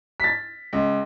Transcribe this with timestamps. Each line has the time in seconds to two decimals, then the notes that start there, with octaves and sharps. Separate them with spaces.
0.20 A6 B6
0.73 C#2